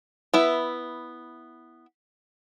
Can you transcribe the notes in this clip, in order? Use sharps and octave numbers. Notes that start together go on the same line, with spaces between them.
B3 E4 E5